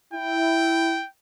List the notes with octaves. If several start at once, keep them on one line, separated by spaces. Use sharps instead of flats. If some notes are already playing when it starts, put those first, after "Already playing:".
E4 G5